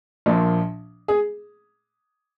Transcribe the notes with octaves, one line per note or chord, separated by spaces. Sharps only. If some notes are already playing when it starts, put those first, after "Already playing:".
A#1 A#2 F3
G#4